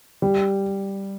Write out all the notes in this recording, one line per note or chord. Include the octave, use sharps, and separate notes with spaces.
G3